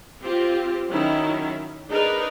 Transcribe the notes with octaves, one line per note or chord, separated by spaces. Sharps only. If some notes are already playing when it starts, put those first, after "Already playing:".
C4 F4 G4
D#3 F#3 C#4 E4
D4 D#4 G#4 A#4 B4